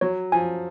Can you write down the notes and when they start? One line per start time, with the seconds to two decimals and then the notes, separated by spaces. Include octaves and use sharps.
0.01 F#3 C#5
0.32 F3 G#5